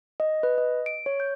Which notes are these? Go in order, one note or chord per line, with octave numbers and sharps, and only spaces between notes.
D#5
B4
D#5
D7
C#5
G6